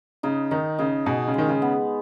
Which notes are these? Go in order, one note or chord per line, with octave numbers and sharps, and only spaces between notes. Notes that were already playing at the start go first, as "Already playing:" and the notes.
C#3 D#4
D#3 D#4
C#3 D#4
B2 G#4
C#3
D#3 G#3
C#3
B3